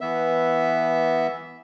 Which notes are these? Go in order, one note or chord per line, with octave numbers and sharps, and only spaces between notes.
E3 B3 E5